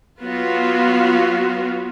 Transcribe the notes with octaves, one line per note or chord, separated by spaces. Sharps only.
F#3 B3 F4 F#4